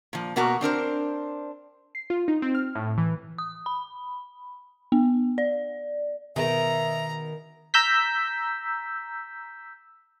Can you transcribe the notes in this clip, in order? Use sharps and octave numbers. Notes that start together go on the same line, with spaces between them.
A#2 F3
B2 A#3 B3 F#4 A#4 A#5
C4 D4 A#4 C5
C7
F4
D#4
C4
F6
A2
E3
D#6
B5
B3
D5
B2 D#3 B3 G#4 E5 A#5
A#5 E6 G6 B6